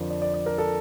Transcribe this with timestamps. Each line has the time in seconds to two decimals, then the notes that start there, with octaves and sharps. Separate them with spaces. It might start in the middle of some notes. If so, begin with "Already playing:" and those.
Already playing: F2 D3 F3 A#4 D5
0.10 D5
0.22 D5
0.34 D5
0.46 A#4
0.58 A4